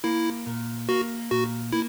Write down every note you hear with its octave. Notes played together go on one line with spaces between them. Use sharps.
A#3 E4
A#2
A#3 F#4
A#2 F#4
A#3 E4